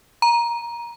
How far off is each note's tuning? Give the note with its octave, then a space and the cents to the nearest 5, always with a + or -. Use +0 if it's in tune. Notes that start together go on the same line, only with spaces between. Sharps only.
A#5 +15